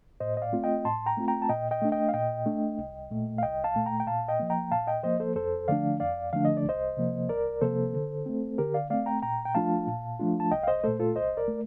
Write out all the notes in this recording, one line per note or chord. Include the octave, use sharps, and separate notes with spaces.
A2 C5 D#5
D#5
D5 F5
A3 C4 F4
D#5 G5
A2 A5 C6
G5 A#5
A3 C4 F4
G5 A#5
A5
A#2 D#5 G5
D#5 G5
A3 D4
D#5 G5
F5
A#2 D#5 G5
A3 D4
C2
A#2 A3
F5
C2 D#5 G5
F5 A5
A#2 A3
G5 A#5
G5
A#2 F5 A5
D#5 G5
F3 A#3
G5 A#5
A#2 F5 A5
D#5 G5
F3 A#3 C5 D#5
A4 C5
F2 A4 C5
D3 F3 A3 D4 D5 F5
F2 D5 F5
D3 F3 A3 D4 F5
D#5
D5
C2 C5 D#5
C3 F3 A#3
C2 A#4 D5
C3 F3 A#3 A4 C5
D3
A3 C4
D3 G4 A#4
D5 F5
A3 C4 D5 F5
G5 A#5
A#2 G5 A#5
G5
F3 A3 D4 F4 F5 A5
A#2
F3 A3 D4 F4
A5
C2 D#5 G5
F5
C5 D#5
A#2 A3 A4 C5
F4 A4
C2 C5 D#5
A#4 D5
A3